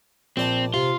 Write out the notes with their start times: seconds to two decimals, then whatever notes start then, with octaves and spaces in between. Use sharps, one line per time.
0.37 A#1 C4 D5 A5
0.74 C3 F4